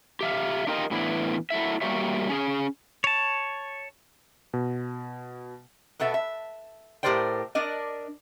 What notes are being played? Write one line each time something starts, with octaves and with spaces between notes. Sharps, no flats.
G4 E5 F5
D4 D#4 F4 G4 A#4 D#5
A2 E3 B3 D4 E4
F#3 A3 E4 E5
G3 A#3 F#4 G4 C#5 E5
C#4 G#4
C#5 A5
B2
B2 B3 A4 E5
E5
A2 G4 A#4 C5 D5 G5
D4 A#4 D5 D#5